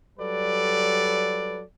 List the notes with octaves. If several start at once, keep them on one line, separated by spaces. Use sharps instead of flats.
F#3 G3 A4 B4 D5